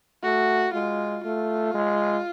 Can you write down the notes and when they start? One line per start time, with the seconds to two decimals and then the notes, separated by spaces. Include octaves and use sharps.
0.23 A3 F#4
0.74 G#3 F4
1.24 A3 F4
1.74 G#3